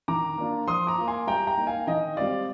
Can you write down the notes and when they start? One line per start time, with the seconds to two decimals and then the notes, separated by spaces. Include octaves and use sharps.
0.08 D#3 A#5 D6
0.38 A#3 D4 F4
0.67 F3 C6 D#6
0.87 A#5 D6
0.98 A#3 F4
1.08 G#5 C6
1.27 G3 G5 A#5
1.47 G5 A#5
1.57 A#3 D#4
1.67 F5 G#5
1.87 D#3 D#5 G5
2.17 G3 C4 F4 D5 F5